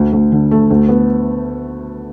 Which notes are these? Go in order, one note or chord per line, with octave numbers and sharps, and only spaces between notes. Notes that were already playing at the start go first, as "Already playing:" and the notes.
Already playing: D2
D2
D3
A3
D2
B3